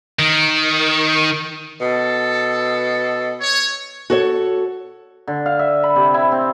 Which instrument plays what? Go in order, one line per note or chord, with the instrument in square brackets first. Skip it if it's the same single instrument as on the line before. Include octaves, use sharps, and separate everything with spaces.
[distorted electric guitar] D#3
[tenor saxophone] B2 [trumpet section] A4
[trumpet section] C#5
[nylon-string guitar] F#4 A4 C#5
[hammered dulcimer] D3
F5
E5
B5
C3
E4
C4